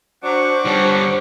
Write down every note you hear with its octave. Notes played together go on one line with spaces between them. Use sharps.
F#3 D4 C5 F#5 C#6 D6
D3 G3 D4 G4 C#5